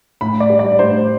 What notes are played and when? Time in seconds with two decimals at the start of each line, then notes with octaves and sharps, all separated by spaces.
0.21 A2 B5
0.40 D5
0.50 G3
0.59 D5
0.79 A2 C5